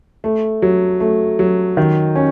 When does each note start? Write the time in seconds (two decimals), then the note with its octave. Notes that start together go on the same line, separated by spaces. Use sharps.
0.24 A3
0.62 F#3
1.00 A3
1.39 F#3
1.77 D#3
2.16 C#4